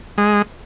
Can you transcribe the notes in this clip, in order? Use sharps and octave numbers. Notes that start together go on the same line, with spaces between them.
G#3